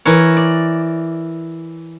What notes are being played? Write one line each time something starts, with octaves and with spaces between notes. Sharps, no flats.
E3 E4 A#4 C#5
D5